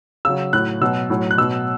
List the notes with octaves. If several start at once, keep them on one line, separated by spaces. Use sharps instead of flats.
C#3 F#3 E6
A2 F#3 F#6
B2 F#3 E6
A2 F#3
F#6
B2 F#3 E6